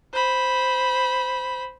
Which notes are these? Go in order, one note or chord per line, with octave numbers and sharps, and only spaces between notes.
C5 B5